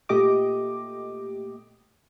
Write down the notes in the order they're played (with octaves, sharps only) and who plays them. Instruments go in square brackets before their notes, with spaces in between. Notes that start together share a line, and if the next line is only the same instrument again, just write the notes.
[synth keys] A#2 A3 G4 D#5 D6